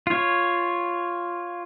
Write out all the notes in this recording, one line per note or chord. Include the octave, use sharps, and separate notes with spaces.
F4 C#5